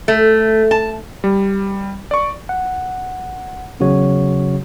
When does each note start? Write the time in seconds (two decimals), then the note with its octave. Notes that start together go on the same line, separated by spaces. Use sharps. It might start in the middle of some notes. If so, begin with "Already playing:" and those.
0.08 A3
0.71 A5
1.24 G3
2.11 D5 C#6
2.49 F#5
3.80 G1 E2 C#3 F#3 F#4 C#5